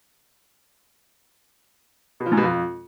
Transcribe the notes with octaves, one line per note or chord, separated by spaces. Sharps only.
B2
F3
G#2
B2
F2